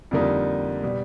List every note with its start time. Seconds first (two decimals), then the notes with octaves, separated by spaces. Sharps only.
0.11 F2 D3 G3 A#3 D#4
0.83 B2 G3